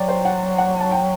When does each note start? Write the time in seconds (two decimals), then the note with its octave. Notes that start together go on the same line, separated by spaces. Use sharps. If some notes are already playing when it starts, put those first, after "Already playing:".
Already playing: F#3 D5 G5
0.08 C5
0.25 F#5
0.58 F#5
0.80 A5
0.91 G5